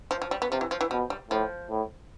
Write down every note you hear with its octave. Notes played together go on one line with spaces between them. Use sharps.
F3
F3
G3
B3
C3 F3
E3
F3
E3
B2 F3
G3
A2 F3
A2